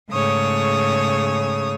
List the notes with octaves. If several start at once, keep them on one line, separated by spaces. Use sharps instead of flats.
G#2 C#3 A3 C#5 D#6